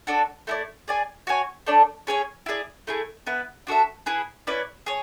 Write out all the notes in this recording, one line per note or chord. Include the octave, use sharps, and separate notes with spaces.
D4 F#4 A4 D5
A3 E4 A4 D5
G#4 D5 G#5
F#4 C#5 G#5
A3 D4 A4 D5
C#4 G#4 C#5 G#5
E4 G#4 D5
A3 E4 G#4
B3 E4 B4
D4 F#4 A4 E5
E4 G#4 B4
C#4 E4 B4 D5
G#4 C#5